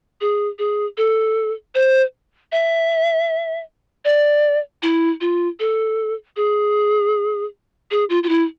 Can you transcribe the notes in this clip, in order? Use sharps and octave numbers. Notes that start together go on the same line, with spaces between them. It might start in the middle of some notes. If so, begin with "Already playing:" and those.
G#4
G#4
A4
C5
E5
D5
E4
F4
A4
G#4
G#4
F4
F4
E4